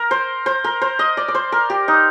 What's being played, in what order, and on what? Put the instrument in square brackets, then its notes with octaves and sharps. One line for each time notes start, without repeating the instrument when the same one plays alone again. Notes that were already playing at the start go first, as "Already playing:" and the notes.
Already playing: [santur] A#4
C5
C5
A#4
C5
D#5
D5
D5
C5
A#4
G4
D#4